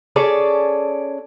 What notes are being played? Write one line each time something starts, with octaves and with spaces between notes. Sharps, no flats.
C#4 G#4 A4 D5